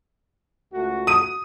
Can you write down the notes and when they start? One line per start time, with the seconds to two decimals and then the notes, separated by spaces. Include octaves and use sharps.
0.73 C#2 A3 F#4
1.07 D#6 D#7